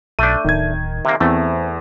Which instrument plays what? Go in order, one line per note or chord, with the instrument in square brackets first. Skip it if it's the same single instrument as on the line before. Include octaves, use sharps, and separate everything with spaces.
[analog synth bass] B1 [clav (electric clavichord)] A3 D4 [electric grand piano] G6 D#7
[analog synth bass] D1 [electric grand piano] D#3 G#6
[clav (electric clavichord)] C3 A#3
[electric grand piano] E2 [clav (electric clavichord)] A3 [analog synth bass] C4